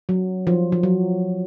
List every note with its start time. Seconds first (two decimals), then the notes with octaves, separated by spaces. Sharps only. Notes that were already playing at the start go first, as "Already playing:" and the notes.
0.09 F#3
0.47 F3
0.72 F3
0.83 F#3